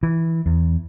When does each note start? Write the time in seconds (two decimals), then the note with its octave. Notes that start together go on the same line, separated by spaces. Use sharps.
0.03 E3
0.46 E2